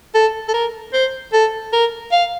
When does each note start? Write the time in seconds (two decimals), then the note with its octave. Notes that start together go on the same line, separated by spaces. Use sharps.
0.15 A4
0.48 A4
0.54 A#4
0.94 C5
1.33 A4
1.73 A#4
2.12 F5